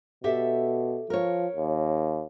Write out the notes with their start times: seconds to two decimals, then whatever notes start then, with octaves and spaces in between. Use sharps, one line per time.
0.24 B2 G4 A4 E5
1.10 F3 A#4 C#5
1.56 D#2